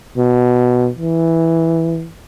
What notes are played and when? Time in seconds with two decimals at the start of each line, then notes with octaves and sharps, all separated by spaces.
0.17 B2
0.99 E3